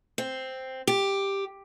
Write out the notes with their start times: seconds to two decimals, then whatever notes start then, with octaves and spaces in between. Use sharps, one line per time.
0.18 C4
0.87 G4